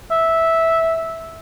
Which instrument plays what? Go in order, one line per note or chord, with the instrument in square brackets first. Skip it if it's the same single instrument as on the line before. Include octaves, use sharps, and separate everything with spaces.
[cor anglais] E5